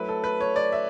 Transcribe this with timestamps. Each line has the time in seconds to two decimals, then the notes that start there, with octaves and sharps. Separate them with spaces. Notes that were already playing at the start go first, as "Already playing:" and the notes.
Already playing: F#3 A3 E4 B4
0.09 A4
0.24 B4
0.41 C#5
0.56 D5
0.72 E5